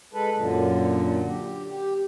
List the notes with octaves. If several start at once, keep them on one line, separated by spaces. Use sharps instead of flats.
G#3 A4 B4
F#2 A#2 D3
G4
G4